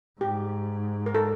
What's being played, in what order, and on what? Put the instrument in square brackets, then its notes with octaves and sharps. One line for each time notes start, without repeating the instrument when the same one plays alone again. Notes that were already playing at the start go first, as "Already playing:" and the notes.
[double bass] G#2 [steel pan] G4
[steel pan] A#4
A4